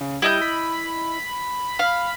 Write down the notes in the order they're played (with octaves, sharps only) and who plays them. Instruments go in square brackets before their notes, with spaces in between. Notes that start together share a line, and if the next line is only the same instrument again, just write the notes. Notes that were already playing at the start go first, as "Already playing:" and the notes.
[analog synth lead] C#3
[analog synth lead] G3 [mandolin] E4 D#5 G6
[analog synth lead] B5
[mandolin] F5